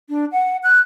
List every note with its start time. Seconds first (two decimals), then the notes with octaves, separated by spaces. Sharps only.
0.09 D4
0.32 F#5
0.63 F#6